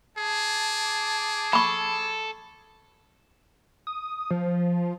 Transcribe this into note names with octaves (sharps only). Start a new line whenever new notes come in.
G#4 A5 D6
A4 B5 C#6
D#6
F3